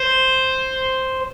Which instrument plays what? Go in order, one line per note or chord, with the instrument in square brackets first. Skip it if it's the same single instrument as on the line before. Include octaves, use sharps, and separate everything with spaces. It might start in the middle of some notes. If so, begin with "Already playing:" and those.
Already playing: [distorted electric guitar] C5